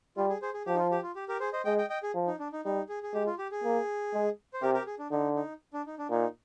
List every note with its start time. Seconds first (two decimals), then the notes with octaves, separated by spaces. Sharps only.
0.17 G3 F4
0.29 G#4
0.42 G#4 C5
0.54 G#4
0.66 F3 G4
0.75 D#4
0.79 F4
0.92 G4
1.03 F4
1.16 G4
1.28 G4 A#4
1.40 G#4 C5
1.53 C5 D#5
1.65 G#3 D#5 G5
1.78 D#5 G5
1.89 D#5 G5
2.03 G#4
2.14 F3
2.27 D#4
2.39 D4
2.53 D#4
2.65 G3 D#4
2.89 G#4
3.03 G#4
3.14 G#3 G4
3.26 F4
3.39 G4
3.51 G#4
3.64 A#3
4.13 G#3
4.54 C5
4.62 C3 G4 A#4
4.74 G4 A#4
4.86 G#4
4.99 D4
5.11 D3 D#4
5.36 D#4
5.74 D4
5.86 D#4
5.99 D4
6.10 A#2 D#4